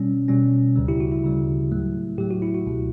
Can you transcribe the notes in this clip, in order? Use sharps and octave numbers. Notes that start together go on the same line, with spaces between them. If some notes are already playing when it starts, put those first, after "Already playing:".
Already playing: B2 G3 C#4
B2 G3 C#4
D2 C#3 G3
E4 G4
F#4
E4
D2 C#3 G3
A2 F#3 A3
A2 F#3 A3 G4
F#4
E4
F#4
C#2 B2 A3 E4